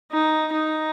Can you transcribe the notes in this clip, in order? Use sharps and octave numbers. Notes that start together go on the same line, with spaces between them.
D#4
D#4